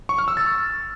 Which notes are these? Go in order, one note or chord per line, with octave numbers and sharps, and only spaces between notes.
C#6
F6
E6
A6